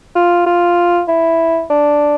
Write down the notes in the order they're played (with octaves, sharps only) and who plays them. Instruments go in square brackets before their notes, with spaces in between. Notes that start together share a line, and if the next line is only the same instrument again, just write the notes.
[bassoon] F4
F4
E4
D4